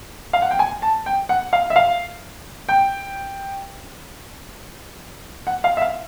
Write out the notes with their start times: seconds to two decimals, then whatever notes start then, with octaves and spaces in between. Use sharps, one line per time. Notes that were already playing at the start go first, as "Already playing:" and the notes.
0.33 F5
0.42 F#5
0.51 G5
0.59 G#5
0.82 A5
1.06 G5
1.29 F#5
1.53 F5
1.70 E5
1.76 F5
2.69 G5
5.47 F#5
5.64 F5
5.77 E5
5.81 F5